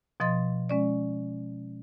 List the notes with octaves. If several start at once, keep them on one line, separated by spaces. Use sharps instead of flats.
B2 F3 D#5 C6 A6
G#3 C#4 D5